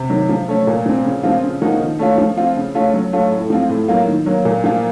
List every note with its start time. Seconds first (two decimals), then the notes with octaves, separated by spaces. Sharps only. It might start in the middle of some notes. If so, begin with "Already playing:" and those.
Already playing: C3
0.10 D#3 F#3
0.29 F3
0.48 A3 C#4
0.67 A#2
0.86 F3 C4
1.05 C#3
1.23 F3 C4 F4
1.43 C#3
1.62 F3 A#3 D#4 F#4
1.80 D#3
1.99 A3 C#4 F4
2.18 F3
2.37 C4 F4
2.56 C#3
2.75 A3 C#4 F4
2.94 F#3
3.13 A3 C#4 F4
3.31 A2
3.50 F3 C4 F4
3.70 A2
3.88 F#3 A#3 F4
4.07 D#3
4.26 F#3 A#3
4.45 A#2
4.64 F3 A#3 F4